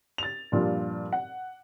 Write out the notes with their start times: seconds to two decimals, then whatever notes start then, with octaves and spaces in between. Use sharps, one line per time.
0.18 A6 F7
0.52 G2 A#2 F3 G3 D4 F4
1.13 F#5